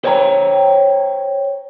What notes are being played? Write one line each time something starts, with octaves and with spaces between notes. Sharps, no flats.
C5 C#5 G5 A5 A#5